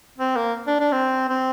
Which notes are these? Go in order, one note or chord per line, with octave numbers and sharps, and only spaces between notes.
C4
A#3
D4
D4
C4
C4